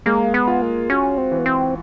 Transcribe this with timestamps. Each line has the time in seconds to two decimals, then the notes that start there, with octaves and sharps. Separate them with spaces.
0.06 G#3 A#3
0.34 B3
0.48 F4
0.62 A#3
0.90 C#4 F#4
1.18 C4
1.32 E3
1.38 B3
1.46 C4